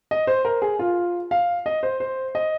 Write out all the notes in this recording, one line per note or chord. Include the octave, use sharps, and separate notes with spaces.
D#5
C5
A#4
G#4
F4
F5
D#5
C5
C5
D#5